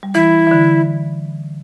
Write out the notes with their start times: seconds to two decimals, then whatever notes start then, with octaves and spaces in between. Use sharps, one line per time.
0.03 G3
0.14 E3 E4
0.47 E3
0.51 D3